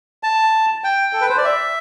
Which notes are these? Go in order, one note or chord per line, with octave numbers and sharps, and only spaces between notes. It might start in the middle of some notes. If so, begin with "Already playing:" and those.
A5
G5
A4
B4
C5
D5
E5